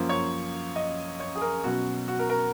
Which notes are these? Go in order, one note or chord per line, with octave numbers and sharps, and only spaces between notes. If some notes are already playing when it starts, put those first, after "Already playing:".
Already playing: F#2 F3 A#3
C#5
D#5
C#5
G#4
A#4
B2 F#3 C#4 F#4
F#4
A#4
A#4